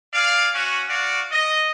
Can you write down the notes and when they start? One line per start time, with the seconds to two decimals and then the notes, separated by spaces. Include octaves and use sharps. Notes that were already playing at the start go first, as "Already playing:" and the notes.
0.13 G#4 D5 F5
0.53 C#4 F#4
0.88 F#4 D5 F5 F#5
1.30 D#5